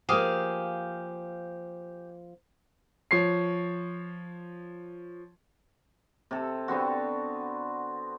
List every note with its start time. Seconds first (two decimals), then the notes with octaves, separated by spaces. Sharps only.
0.09 F3 A#3 G4 G#4 F5
3.11 F3 C#5 C7
6.31 C3 A4
6.68 D3 B3 C4 F#4